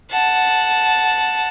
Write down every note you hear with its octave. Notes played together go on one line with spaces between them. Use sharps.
F#5 A5